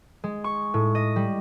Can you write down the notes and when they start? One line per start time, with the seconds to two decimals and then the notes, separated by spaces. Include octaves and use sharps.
0.24 G#3
0.44 C#6
0.74 A2
0.95 D#5
1.16 G3